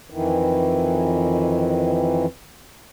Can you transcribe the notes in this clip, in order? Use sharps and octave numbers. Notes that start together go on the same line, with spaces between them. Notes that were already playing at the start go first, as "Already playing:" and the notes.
F2 D#3 E3